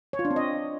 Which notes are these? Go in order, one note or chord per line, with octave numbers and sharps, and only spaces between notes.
C#5
F4
D4
C4
D#5